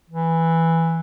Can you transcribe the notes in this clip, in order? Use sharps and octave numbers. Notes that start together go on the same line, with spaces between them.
E3